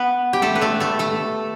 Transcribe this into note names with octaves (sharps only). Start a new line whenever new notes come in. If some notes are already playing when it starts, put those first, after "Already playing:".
Already playing: B3 B4
G4
A3 A4
B4
A3 A4
A3 A4
A3 A4